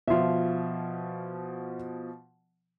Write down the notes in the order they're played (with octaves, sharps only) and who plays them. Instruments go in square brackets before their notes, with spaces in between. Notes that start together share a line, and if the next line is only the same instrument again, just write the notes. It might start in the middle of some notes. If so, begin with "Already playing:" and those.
[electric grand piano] B2 F3 [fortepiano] F4 E5